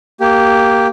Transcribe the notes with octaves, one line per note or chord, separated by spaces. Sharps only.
A#3 G4